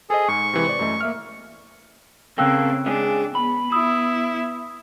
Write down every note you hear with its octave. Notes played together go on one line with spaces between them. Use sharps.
G#4 A4 C5 D#5
G#2 C#6
C3 E3 G#3
C5 D5
F#2 A3 D#5
A#3 E5 F6
C#3 A#3 C4 A4 G5 E6 F#6
G#3 C#4 D4 G#4
B3 B5
B3 E4 D#6 E6